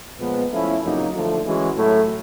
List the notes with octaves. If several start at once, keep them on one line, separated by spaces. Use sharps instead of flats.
A#2 F3 G#3 B3
F3 A3 C#4 E4
F2 C#3 F#3 A#3 D#4
D3 F3 A3
E3 G#3 C#4 F#4
A2 F#3 A3